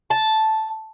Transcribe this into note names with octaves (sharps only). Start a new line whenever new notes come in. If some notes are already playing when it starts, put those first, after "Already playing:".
A5